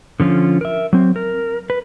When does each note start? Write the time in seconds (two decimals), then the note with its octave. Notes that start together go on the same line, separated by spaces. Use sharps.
0.20 D3 F3 C#4 F4
0.61 A#4 E5
0.93 F#3 C4
1.16 A#4
1.70 B4